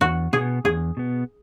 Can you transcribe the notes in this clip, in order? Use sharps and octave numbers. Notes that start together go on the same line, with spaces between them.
E2 F#4
B2 B3 G#4
E2 G#4
B2 B3